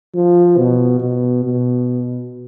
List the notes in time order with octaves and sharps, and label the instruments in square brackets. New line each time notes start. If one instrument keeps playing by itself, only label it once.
[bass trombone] F3
B2
B2
B2